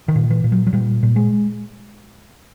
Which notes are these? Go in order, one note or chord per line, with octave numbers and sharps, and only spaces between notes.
D#3
A#2
E3
A#2
F#3
F#3
A#2 G3
A#2
G#3